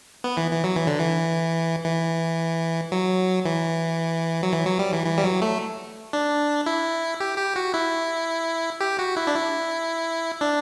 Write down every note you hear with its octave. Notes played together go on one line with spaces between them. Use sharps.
B3
E3
E3
F#3
E3
D3
E3
E3
F#3
E3
F#3
E3
F#3
G3
E3
E3
G3
F#3
A3
D4
E4
G4
G4
F#4
E4
G4
F#4
E4
D4
E4
D4